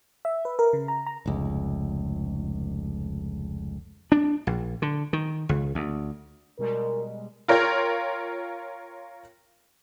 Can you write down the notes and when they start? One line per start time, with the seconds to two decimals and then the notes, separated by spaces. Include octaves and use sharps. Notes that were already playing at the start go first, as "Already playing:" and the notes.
0.25 E5
0.45 B4
0.59 A#4
0.73 C#3
0.88 A#5
1.06 A#5
1.26 F1 C#2
4.12 D4
4.47 A#1
4.82 D3
5.13 D#3
5.49 C#2
5.75 D2
6.59 B2 G3 G#3 A#4
7.48 F4 A#4 C#5 G5 C6